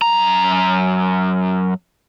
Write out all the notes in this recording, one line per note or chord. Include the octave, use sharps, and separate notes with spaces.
F#2 A#5